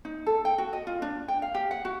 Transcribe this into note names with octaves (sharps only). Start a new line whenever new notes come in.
D#4
A4
G5
F#4
D#5
F4
D4
G5
F5
G4
F#5
F#4